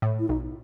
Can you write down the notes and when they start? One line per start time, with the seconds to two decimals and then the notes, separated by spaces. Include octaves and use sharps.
0.02 A2
0.19 E4
0.29 B1 D#4